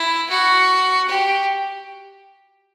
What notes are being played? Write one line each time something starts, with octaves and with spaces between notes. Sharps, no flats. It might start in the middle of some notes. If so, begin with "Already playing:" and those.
Already playing: E4
F#4
G4